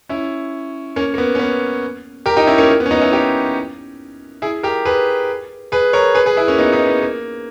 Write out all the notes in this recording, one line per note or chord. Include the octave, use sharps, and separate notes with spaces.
C#4 E4
A#3 C#4
A#3
B3
C#4
B3
G4 A#4
D#4 G4
C#4 E4
A#3 C#4
A#3
B3
C#4
B3 D#4
C#4 E4
D#4 G4
E4 G#4
G4 A#4
G#4 B4
G#4 B4
A#4 C#5
G#4 B4
G#4 B4
E4 G#4
A#3 C#4
B3 D#4
B3 D#4
B3
A#3